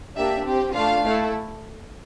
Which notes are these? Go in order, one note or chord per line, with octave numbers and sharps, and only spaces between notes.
A#3 D4 G4 E5
C4 G4
A3 D4 F4 F5
A3 E4 A4